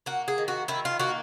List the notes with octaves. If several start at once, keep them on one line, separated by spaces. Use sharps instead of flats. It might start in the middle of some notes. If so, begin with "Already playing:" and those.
A#3 F#4
G#4
D#3
F#4
D#3 E4
F4
A#3 F#4